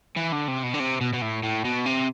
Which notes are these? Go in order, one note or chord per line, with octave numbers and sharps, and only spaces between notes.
E3
D3
C3
B2
D3
C3
B2
B2
A2
A2
B2
C3